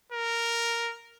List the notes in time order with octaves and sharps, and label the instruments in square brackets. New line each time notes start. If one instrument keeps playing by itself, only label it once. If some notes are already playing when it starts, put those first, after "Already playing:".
[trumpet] A#4